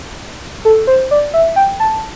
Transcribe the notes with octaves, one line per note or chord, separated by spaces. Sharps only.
A4
C5
D5
E5
G5
A5